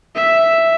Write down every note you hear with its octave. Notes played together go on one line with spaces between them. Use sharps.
E5